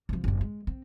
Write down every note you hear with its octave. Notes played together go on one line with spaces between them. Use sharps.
C3 F3
F#1 C3
G#3
C4